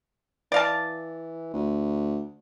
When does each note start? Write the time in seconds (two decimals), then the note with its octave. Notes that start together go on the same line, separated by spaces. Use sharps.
0.52 E3 D5 F5 A5
1.53 D2